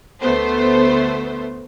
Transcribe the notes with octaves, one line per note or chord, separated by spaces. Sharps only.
D2 A3 B3 C5